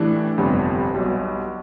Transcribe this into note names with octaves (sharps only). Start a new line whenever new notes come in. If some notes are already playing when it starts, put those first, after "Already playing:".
Already playing: A2 E3 A3 D4 G4
G1 F2 C3 G3 B3
B1 B2 G3